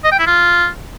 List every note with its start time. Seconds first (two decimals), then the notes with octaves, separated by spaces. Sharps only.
0.04 D#5
0.12 G5
0.19 E4
0.27 F4